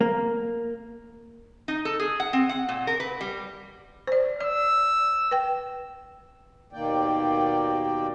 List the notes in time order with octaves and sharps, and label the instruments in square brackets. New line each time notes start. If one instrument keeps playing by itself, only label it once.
[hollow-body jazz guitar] A#3
[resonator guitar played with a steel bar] D#4
A4
G#4
F#5
C4
F#5
A#2
A#4
B4
G3
[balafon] C5 D5
[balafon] D5 [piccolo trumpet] E6
[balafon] B4 G5
[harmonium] D#2 B2 D#3 A#3 D5 G5